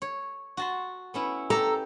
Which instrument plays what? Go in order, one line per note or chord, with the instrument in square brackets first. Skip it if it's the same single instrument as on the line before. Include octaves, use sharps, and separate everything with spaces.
[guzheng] C#5
F#4 A5 C6
B3 C#4 E4
[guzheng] G4 [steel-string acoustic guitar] A4 A#5